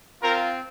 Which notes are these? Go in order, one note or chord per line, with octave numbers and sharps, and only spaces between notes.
C4 F4 A#4